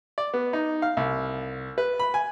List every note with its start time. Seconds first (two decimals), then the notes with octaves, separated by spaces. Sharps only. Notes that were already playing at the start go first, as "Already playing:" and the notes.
0.18 D5
0.34 B3
0.53 D#4
0.82 F5
0.97 C2
1.78 B4
2.00 B5
2.14 G#5